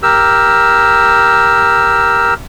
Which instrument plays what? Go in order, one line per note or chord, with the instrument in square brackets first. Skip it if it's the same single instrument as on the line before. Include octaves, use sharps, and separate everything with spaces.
[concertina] G4 A#4 E6